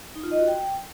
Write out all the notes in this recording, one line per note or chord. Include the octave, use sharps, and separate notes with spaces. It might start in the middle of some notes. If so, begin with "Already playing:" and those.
D#4
F4
D#5
F#4
G5